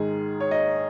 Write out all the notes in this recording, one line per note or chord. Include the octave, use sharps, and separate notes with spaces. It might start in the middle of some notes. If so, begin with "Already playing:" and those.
Already playing: G#2 D#3 G#3 G#4
C#5
D#5